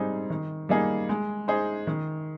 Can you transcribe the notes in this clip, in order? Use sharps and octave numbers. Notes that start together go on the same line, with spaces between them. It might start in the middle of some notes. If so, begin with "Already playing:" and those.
Already playing: G#2 G3 C4 D#4 G#4
D#3
G3 A#3 D#4 G#4
G#3
D#4 G#4 C5
D#3